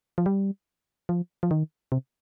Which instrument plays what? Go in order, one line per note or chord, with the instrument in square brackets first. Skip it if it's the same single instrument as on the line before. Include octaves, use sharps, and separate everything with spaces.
[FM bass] F3
G3
F3
F3
D#3
C3